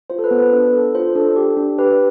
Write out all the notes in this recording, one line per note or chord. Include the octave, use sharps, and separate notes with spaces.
F4 C5
A4
B4
B3
B4
D4
A4
F4 C5
D4 A4
G4
D4
G4 B4